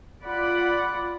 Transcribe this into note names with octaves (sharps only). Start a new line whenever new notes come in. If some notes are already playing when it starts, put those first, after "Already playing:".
F4 D5 F#5 B5